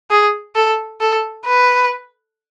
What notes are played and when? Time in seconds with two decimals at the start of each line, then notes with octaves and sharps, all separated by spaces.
0.11 G#4
0.56 A4
1.01 A4
1.46 B4